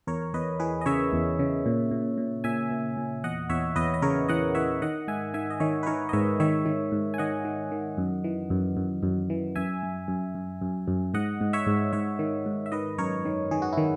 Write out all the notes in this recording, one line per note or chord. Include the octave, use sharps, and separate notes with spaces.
E2 A#4 C#5
E2 B4 D#5
E3 G#4 B4
D#5
C#3 C#5 E5
E2
C#3
A#2
A#2
A#2
A#2 E5 G#5
A#2
A#2
E2 D#5 F#5
E2 C#5 E5
E2 B4 D#5
D#5
C#3 A#4 C#5
E3 D#5 F#5
E3 C#5 E5
D#3 D#5 F#5
G#2 E5 G#5
D#3 E5 G#5
D#5
D#3 C#5 E5
B4
D#3 A#4 C#5
D#5
G#2 C#5 E5
D#3 C#5 E5
D#3
G#2
G#5
D#3 D#5 F#5
D#3
D#3
F#2
E3
F#2
F#2
F#2
E3
F#2 E5 G#5
F#2
F#2
F#2
F#2
F#2
G#2 D#5 F#5
G#2
C#5 E5
G#2
G#2 C#5 E5
D#3
G#2
E5
D#3 B4 D#5
F#2 A#4 C#5
D#3
D#3 G#4
F#4
D#3 E4